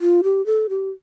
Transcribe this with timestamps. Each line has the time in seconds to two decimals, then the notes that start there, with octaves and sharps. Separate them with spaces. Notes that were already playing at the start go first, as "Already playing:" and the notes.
0.01 F4
0.24 G4
0.46 A4
0.70 G4